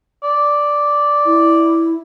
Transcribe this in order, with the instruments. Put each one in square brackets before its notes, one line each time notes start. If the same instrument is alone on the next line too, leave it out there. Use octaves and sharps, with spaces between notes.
[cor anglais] D5
[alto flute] E4